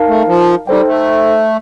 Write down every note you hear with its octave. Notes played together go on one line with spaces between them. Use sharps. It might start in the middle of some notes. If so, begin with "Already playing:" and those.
Already playing: D#4 A#4 F5 A5
A3
F3
G3 D#4 A4 C5 G5
A3